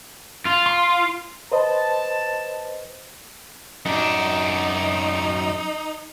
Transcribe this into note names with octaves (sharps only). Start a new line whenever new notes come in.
F4
C6
B4 C5 D#5 A5
F#2 D4 D#4